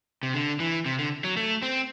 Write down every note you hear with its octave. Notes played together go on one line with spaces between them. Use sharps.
C3
D3
E3
C3
D3
F#3
A3
C4